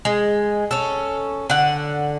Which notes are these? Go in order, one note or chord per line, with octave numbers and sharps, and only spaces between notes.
G#3
C#4 A4
D3 F#5